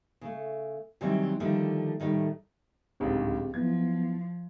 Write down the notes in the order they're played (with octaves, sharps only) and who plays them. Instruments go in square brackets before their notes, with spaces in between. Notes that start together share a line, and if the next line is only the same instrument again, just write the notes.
[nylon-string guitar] C#3 A3
C3 D#3 E3 F#3 G3 C4
D3 D#3 F3 G3 A3
A2 D#3 G3 A3
[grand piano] D1 C#2 G#2 [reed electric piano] C4 G4 G#4
[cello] F3 [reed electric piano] F#3 B3 E4 [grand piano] G#6